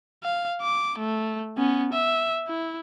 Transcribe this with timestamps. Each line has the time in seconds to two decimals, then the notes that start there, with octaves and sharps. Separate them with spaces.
0.23 F5
0.61 D6
0.98 A3
1.57 B3 C#4
1.93 E5
2.48 E4